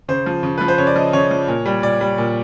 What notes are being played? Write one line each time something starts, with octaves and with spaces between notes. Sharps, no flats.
C#3 C5
F3
C#3
F3 B4
C5
C#3 C#5
D5
F3 D#5
C#3 C#5
F3
A#2
G3
A#2 D5
G3
A#2